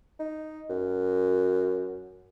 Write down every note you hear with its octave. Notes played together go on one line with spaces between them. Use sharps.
D#4
F#2